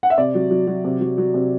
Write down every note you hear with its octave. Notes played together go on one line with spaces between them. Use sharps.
F#5
E5
C3 D5
F#3
F#3
F#3
C3
F#3
F#3
C3